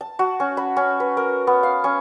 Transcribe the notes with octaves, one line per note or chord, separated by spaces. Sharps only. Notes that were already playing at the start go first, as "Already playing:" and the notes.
A5
F#4
C#4
B5
C#4
B4
A#4
B3
F5
C#4